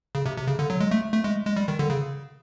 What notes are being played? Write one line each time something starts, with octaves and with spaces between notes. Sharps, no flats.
C#3
C3
C3
C#3
D3
F#3
G#3
A3
A3
G#3
G#3
G3
D#3
D3
C#3